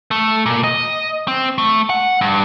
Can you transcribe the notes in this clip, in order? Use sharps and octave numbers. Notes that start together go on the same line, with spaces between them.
A3
A#2
D#5
C4
A3
F#5
G2